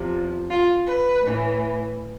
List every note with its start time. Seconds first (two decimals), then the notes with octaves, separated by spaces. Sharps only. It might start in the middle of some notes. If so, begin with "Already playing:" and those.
Already playing: E2 C3 F3
0.50 F4
0.86 B4
1.23 A2 E3